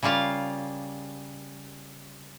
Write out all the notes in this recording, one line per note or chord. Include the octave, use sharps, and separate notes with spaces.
C#3 G3 A#3 F4 F5